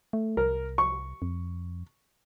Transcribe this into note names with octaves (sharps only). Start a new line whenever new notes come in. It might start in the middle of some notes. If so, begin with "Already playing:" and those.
A3
C2 A#4
C#6
F2